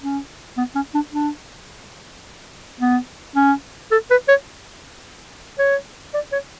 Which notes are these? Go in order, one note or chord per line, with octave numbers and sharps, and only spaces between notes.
C#4
B3
C#4
D4
D4
B3
C#4
A4
B4
C#5
C#5
D5
C#5